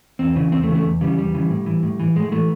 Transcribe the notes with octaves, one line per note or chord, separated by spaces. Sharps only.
E2 C4
C#3 E3
E2 C4
A3
C#3 E3
A3
E2
C#3 E3 G3
E2 G3
C#3 E3
A2
E3
A2
E3
A2 G#3
E3 A3